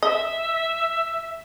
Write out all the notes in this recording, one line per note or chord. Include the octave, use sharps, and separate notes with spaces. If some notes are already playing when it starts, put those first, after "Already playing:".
D#5 E5